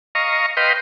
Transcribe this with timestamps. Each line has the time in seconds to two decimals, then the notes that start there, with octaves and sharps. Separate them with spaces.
0.15 D#5 F5 A#5 C#6
0.57 B4 D#5 F5 G5 C6